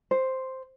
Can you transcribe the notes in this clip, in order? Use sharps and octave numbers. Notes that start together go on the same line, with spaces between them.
C5